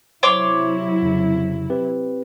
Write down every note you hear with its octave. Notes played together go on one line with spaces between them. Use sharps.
C3 F#3 E4 C5 C#5 C6 D6
F2 C#3
C4 G4 B4